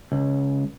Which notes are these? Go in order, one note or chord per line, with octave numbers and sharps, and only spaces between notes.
C#2